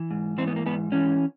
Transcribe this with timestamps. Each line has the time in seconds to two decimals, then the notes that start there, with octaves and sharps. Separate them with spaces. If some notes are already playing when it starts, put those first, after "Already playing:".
Already playing: E3
0.11 G#2
0.38 E3 C4
0.47 B3
0.56 A#3
0.66 G#2 B3
0.92 E3 C#4